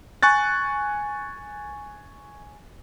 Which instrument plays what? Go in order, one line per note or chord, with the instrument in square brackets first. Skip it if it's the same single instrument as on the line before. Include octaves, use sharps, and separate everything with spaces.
[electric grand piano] G#5 C#6 F#6 A6